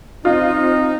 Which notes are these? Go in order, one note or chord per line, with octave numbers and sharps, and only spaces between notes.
C4 D#4 F4